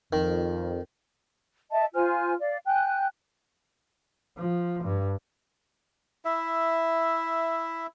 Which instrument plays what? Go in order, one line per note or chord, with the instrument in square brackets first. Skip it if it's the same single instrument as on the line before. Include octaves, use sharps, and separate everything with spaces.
[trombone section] F2 [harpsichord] D#3
[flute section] D#5 E5 A5
F4 C5 G#5 F6
D5 F5
G5 G#5 F#6
[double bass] F3
G2
[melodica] E4 E5